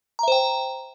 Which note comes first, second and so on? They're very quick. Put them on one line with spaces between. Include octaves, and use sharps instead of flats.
A#5 E5 C5 G5